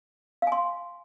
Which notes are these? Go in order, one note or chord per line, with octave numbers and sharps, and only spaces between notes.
F5 G#5 C6